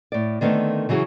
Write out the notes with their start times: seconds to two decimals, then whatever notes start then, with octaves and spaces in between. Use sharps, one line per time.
0.12 A2 D5
0.41 D3 D#3 A3 B3 C4
0.89 C#3 E3 F#3 F#4 G#4